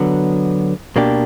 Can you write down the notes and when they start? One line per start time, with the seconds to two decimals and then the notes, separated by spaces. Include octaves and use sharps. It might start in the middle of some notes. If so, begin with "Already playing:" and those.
Already playing: D3 F#3 B3
0.96 B2 A#3 D4 G4